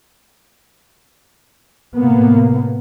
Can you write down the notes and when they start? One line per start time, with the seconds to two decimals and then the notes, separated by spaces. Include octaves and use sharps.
1.96 A2 C3 A#3 B3